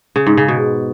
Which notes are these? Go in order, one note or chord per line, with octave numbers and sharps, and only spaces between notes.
C#3
G#2
C#3
B2